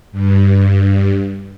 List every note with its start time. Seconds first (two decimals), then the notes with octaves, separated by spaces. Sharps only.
0.12 G2